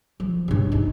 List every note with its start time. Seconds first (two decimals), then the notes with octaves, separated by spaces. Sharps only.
0.20 F3
0.48 G2 C#3
0.72 D#4